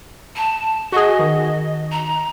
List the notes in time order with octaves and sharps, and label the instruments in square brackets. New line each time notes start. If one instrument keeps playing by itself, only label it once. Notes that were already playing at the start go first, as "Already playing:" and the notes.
[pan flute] A5
[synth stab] F#4 G#4 [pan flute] D#5
[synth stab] D#3
[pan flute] A#5